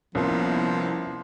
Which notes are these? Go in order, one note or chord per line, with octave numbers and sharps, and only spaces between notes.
C2 F3 A#3 B3 C#4 E4 A#4 B4